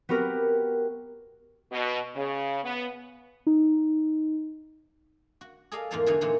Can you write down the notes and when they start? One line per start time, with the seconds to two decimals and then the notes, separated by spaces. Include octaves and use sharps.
0.09 B3 C4 F#4 G4 A#4
1.71 B2
2.15 C#3
2.64 B3
3.47 D#4
5.41 F#4
5.72 G#4 A4 D5 D#5 F5
5.91 E2 G#2 F3 A#3 F5 A5
6.06 D3 E3 F3 F#4 G#4 F5
6.21 A#2 E3 G#3 D#4 F#5